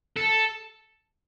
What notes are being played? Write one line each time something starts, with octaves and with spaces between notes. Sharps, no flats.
A4